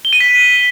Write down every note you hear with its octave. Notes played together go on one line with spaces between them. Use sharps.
G7
D#7
B6